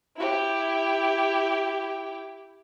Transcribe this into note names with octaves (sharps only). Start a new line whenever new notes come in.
E4 G4